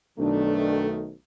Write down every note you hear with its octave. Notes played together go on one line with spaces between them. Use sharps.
B1 D#3 A3 D4